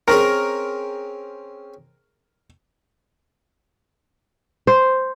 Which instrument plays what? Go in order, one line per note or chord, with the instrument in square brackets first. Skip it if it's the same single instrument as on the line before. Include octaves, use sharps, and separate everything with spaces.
[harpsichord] C4 C#4 G#4 [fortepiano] A#4
[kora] C5